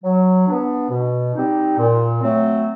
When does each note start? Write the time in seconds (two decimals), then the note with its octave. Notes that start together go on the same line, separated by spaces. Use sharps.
0.04 F#3
0.48 B3 D4
0.90 B2
1.35 G3 C4 D#4
1.78 A#2
2.22 F#3 A3 C4